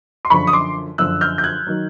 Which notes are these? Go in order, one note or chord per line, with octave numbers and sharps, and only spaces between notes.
C6
F#2 D3 F3 B5 C#6
D#6
C6 D6
F#2 D3 F3 E6 F#6
F6 G6
G6
F#6 G#6
D#3 F#3